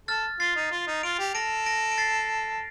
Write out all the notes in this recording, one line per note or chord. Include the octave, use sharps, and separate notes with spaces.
A4 F6 A6
F4 A6 C7
D#4
F4
D#4
F4 D7 F7
G4
A4 A#6 D7
A#6 D7
D7
A6 C7